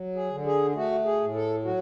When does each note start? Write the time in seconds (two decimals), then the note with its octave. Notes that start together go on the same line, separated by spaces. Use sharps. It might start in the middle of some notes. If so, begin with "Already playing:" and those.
Already playing: F#3
0.15 G#4
0.30 D3
0.46 G#4
0.75 A3 F#4
1.05 G#4
1.20 A2
1.35 A4
1.65 F#3 F#4